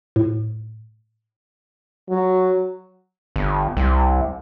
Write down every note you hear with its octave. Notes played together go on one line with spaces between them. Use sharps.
A2
F#3
G1
C2